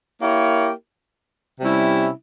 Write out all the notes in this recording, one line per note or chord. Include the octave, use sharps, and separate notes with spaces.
A#3 E4 G4 A#4 C#5
C3 G3 C#4 E4